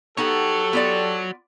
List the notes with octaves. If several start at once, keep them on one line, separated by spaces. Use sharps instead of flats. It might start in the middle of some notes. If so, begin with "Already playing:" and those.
B3 D#4 F#4 G4 A4 C#5 F#5
B3 F4 D5